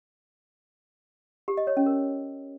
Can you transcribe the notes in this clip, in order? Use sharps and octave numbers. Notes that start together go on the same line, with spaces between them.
G4
D#5
C#5
C#4
A#4